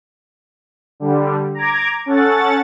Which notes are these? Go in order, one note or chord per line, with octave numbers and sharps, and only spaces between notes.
D3 G3
A#5 D6 G#6
C#4 A4 F#5 A6